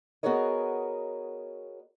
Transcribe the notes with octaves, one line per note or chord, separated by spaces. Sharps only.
B3 F#4 G#4 A#4 C#5 D#5